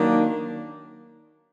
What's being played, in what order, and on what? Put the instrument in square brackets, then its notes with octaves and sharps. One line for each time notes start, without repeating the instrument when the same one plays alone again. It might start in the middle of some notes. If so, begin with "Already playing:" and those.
Already playing: [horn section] D#3 F#3 A#3 D4